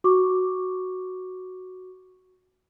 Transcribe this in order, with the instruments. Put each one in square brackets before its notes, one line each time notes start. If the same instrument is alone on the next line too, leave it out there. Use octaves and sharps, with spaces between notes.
[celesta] F#4 C#6 D6